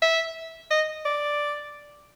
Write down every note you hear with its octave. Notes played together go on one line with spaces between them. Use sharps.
E5
D#5
D5